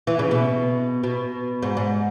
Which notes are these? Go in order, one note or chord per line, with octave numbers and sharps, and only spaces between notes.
E3
C#3
B2
B2
G#2
G#2